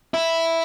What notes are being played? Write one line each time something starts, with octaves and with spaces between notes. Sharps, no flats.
E4